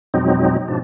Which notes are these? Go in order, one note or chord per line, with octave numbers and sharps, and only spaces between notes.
F2 B2 F#3 G#3 C4 D#4
G#2 B2 F3 D4